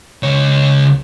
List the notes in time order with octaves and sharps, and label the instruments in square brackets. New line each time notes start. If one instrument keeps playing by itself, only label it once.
[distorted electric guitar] C#2 C#5